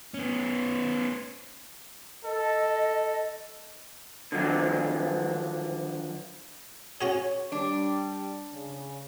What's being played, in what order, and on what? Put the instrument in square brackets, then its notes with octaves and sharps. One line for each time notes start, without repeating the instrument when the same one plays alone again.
[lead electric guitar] B3 C#4
[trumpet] A4 [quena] D#5
[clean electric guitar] D3 D#3 F3 F#3 D4
[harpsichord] C#4 F#4 G#4 [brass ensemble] C#5
[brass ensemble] G3 [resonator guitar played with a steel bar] D4
[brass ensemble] C#3